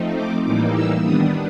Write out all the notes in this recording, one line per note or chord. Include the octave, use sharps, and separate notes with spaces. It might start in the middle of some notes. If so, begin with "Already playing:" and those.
Already playing: F3 A3 C4 D#4
D6
A2 E3 G3 A#3 D#4 D6
E6
D#3 G3 B3 D4 D#6